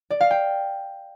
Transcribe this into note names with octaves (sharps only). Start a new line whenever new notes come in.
D5
F5
G5